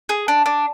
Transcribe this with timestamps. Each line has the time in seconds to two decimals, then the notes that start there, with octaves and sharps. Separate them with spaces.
0.09 G#4
0.28 D4
0.46 D4